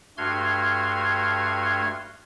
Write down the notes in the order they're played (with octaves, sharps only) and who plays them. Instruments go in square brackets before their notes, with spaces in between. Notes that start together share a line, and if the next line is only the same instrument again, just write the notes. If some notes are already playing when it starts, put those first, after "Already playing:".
[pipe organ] G2 A3 F#4 C6 F6 G#6